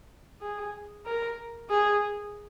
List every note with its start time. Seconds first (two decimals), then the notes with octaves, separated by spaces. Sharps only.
0.41 G#4
1.06 A#4
1.70 G#4